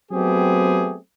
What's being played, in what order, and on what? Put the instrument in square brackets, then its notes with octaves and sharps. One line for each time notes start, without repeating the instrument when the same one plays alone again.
[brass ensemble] F#3 A3 B3 C4 G4 G#4